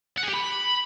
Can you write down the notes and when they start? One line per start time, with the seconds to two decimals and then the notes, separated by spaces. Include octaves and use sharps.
0.18 F#5
0.23 G#4
0.28 G4
0.34 B5